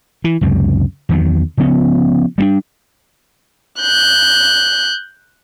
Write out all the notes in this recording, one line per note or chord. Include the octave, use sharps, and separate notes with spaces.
E3
C#2 F#2 C3
E2 D#3 F#3
C#3 F3 B3 C#4
G3 A3 D4
F#6 G6